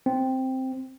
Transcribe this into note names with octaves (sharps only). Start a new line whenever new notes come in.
C4